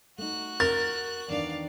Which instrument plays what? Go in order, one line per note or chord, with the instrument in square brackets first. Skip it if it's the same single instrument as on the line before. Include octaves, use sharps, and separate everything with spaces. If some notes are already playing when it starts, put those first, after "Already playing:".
[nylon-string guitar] A3 D#4 [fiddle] F#4 F#6
[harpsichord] A#4 [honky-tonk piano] A6
[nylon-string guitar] E2 D#3 D4 [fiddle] D5 F5